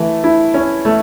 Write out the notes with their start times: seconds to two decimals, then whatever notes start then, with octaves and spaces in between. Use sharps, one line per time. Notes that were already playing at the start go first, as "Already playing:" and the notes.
Already playing: E3 A3
0.24 E4
0.54 C#4
0.85 A3